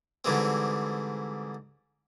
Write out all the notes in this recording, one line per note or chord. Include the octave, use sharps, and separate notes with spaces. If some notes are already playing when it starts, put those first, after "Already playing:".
G#2 D3 E3 G3 G#3 C4